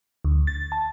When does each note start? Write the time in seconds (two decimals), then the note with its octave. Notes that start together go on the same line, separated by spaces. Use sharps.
0.25 D2
0.47 A6
0.72 A5